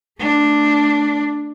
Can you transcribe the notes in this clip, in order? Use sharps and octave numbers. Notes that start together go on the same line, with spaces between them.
A3 D4